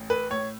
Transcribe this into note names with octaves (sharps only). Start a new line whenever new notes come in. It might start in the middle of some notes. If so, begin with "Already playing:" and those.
Already playing: A1
B4
A2 C#5